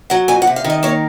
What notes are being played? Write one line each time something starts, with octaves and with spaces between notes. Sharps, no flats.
F#3 F#5
F2 G#5
F#5
C3
F5
D#3
D#5
A#3 C#5